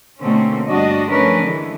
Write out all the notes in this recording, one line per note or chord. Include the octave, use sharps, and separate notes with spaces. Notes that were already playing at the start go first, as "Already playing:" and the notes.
B2 D3 A3 A#3 C4 C#4
G2 G3 D4 F#4 D#5
F3 A3 C#4 D4 A#4 B4
D3 E3 G#3